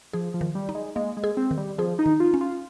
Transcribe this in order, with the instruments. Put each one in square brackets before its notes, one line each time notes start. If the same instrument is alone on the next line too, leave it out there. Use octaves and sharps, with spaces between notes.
[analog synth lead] F3 [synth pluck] G#4
[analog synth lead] F3
[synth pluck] D#3
[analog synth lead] G3
[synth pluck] D#4
[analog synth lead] G#3
[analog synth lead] G#3 [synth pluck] A#3
[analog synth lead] G#3
[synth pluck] G#4
[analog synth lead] C4
[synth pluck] D#3
[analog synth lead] G3
[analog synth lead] F3 [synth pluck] G#4
[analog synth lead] D#4
[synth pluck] D#3
[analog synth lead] F4
[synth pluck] C#4
[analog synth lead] F4